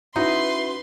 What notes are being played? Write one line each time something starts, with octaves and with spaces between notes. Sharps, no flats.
C#4 D#4 E4 F#4 B4 C6